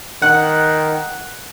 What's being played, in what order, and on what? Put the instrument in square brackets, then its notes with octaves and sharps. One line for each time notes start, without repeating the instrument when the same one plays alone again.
[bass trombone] D#3 [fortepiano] F#5